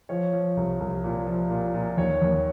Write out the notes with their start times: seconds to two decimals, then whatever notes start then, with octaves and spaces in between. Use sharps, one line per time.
0.09 F3 C#5
0.33 F3
0.57 C2
0.80 C2
1.04 A#2
1.27 F3
1.50 A#2
1.74 A#2
1.97 D#2 C#5
2.22 D#2